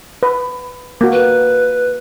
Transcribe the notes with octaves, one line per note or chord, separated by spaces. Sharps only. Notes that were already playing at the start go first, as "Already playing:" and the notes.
B4
A#3 F#4
B4